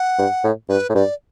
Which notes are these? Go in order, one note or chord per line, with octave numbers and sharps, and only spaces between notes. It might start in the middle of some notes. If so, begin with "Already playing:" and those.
Already playing: F#5
G2
A2
G2 B4
A2
G2 D5